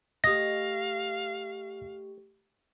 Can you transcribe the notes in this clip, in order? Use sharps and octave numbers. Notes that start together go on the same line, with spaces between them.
A3 G4 D#5 F5 A#6